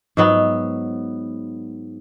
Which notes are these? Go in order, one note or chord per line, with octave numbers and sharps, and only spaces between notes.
G#2 F#3 B3